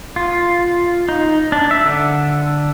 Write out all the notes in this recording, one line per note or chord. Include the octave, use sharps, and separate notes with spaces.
F4
D#4
D4
E5
D3